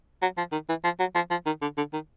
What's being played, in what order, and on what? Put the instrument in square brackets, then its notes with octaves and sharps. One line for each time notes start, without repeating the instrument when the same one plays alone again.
[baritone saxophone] F#3
F3
D#3
E3
F3
F#3
F3
F3
D#3
D3
D3
D#3